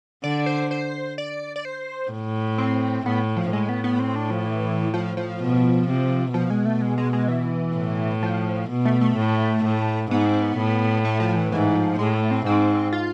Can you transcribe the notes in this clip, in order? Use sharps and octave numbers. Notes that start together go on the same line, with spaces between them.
D3 D5
C5
C5
D5
D5
C5
A2
C4
A2 B3
F3
A2 G#3
B3
B3
C4
D4
F3
E3
F3
F3
B2
C3
B2 F3
G#3
A3
G#3
G#3
G#3
E3
A2
F3
B2
A3
A3
A2
A2
G#2 B3
C4
B3
A2
A3
F3
E3
G#2 E3
F3
A2 G#3
A3
C4
G#2 C4
F4